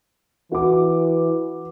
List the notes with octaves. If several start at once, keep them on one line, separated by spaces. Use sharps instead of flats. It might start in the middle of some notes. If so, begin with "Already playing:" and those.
E3 F#4 D6